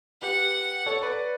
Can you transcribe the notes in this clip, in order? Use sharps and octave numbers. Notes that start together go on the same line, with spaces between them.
G4 B4 F#5
A4 C#5
B4 D5